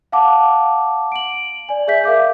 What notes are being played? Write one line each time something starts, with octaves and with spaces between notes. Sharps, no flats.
F5 F#5 A5 D6
D7 F#7
D5 G#5
G#4 E5 G6 B6
A#4 F5 D6 G6